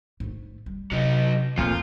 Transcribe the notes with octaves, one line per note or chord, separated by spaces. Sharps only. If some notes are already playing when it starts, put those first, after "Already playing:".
G#2 A3
G3
C3 F#3 D#4
F2 A#2 E3 F3 A3 F4